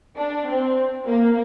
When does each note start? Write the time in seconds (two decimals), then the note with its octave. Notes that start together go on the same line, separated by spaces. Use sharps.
0.17 D4
0.47 C4
1.06 A#3